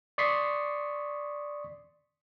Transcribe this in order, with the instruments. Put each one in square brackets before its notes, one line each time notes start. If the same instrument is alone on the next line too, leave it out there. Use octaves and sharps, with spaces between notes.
[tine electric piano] D5 C6 C#6 D#6 B6 C7